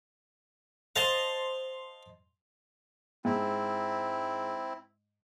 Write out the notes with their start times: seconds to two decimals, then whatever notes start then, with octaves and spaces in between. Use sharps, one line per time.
0.96 C5 D#5 F5 A5 C6
3.25 G#2 C4 E4